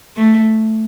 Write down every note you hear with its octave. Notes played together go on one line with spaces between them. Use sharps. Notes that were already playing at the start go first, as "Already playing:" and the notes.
A3